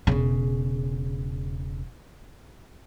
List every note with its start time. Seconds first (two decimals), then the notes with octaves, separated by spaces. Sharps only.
0.07 E1 C#3